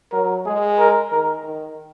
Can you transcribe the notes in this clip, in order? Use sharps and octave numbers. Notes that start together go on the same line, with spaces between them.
F#3 A#4
G#3 G#4
A#4
D#3 A#4
D#3